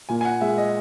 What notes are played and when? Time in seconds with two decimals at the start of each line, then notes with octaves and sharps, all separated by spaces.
0.09 A#2 G#5
0.21 G#5
0.25 F#5
0.41 G#3 E5
0.58 D#5